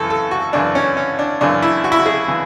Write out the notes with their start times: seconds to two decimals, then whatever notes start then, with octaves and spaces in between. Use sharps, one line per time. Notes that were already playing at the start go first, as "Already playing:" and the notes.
Already playing: F#2 C#3 E3 A4
0.10 A4
0.31 F#4
0.53 F#2 C#3 E3 D4
0.75 C#4
0.97 C#4
1.19 D4
1.41 F#2 C#3 E3 D4
1.62 E4
1.84 F#4
1.92 E4
1.99 F#4
2.06 G#4
2.28 C#3 E3